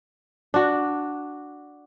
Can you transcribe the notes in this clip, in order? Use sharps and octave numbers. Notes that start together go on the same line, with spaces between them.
D4 F#4